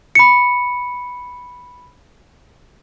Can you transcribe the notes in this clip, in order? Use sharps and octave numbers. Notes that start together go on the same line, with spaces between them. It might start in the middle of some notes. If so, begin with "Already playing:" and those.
B5 C#7